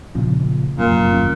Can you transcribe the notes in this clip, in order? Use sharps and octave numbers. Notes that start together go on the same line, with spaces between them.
A#2 C#3 F3
F1 F#2 A#2
G1 D#2 C#4